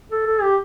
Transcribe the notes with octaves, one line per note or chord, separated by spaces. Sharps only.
A4
A4
G4